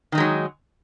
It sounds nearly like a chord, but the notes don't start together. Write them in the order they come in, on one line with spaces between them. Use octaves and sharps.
D#3 D#4 G#3 F#3